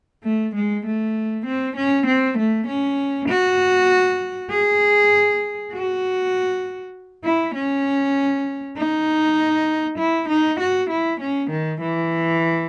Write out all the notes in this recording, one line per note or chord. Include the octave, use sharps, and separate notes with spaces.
A3
G#3
A3
C4
C#4
C4
A3
C#4
F#4
G#4
F#4
E4
C#4
D#4
E4
D#4
F#4
E4
C#4
D#3
E3